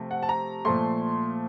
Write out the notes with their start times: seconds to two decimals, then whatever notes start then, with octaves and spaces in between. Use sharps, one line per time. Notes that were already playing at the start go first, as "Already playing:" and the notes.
Already playing: C3 F3 A3
0.11 F#5
0.23 A5
0.29 A#5
0.65 A#2 F3 A3 C6